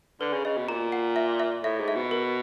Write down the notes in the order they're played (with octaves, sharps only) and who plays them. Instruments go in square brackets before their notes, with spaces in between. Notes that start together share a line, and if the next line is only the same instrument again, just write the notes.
[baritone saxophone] D3 [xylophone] B4
[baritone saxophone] C#3
[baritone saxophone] C#3 [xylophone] D#5
[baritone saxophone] B2
[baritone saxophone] A#2 [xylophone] A#5
[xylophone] F#5
E5
E5
[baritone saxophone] A2 [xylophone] E5
[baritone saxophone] G#2
[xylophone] E5
[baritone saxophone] B2
[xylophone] A#4